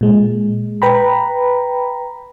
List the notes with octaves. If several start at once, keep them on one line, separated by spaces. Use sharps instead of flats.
A#2 G#3
B4 G5 A#5 B5